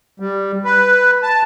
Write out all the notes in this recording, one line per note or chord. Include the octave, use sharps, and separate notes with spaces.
G3
B4
A5